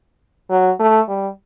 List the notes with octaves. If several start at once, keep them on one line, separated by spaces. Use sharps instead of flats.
F#3
A3
G3